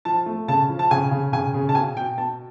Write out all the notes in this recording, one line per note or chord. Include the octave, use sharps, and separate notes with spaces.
F3 A5
A3
C#3 A5
F3
A5
C#3 G#5
C#3
C#3 G#5
C#3
A5
B2 G#5
B2 G5
B2 A5